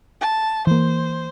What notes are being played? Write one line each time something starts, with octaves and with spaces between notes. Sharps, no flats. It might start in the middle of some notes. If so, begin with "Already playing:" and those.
A5
E3 A#3 C5